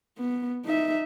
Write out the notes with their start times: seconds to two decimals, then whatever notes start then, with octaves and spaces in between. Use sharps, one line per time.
0.18 B3
0.65 D#4 E5